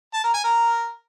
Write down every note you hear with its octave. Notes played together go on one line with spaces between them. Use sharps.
A5
A#4
G#5
A#4